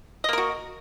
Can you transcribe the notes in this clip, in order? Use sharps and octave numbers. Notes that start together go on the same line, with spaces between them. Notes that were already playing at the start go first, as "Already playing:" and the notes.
A#3 F#4 A#4 D#5